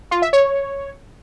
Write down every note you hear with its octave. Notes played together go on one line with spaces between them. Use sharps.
F4
E5
C#5